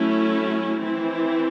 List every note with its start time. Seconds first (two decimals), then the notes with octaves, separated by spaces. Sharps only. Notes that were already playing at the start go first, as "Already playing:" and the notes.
Already playing: F#3 A3 C#4 E4
0.80 E3 C4 E4